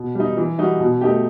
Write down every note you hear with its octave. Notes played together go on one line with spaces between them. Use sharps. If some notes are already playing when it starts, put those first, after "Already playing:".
Already playing: B2
G3 D#4
E3
G3 D#4 F#4
B2
A3 D#4 G4